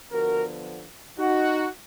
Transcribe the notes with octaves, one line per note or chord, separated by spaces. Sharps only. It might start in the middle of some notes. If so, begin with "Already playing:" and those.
D3 F3 B3 F#4 A#4
D#4 F#4